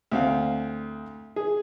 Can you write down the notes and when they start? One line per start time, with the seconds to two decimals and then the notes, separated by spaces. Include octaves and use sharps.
0.11 D2 C4 F5
1.36 G#4